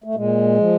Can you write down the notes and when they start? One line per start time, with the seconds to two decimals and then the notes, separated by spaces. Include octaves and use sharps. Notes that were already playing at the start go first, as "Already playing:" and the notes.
0.04 A3
0.15 A#2 G#3
0.58 F3